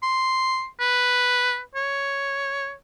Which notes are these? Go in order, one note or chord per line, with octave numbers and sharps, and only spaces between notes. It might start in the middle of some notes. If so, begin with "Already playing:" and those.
C6
B4
C#5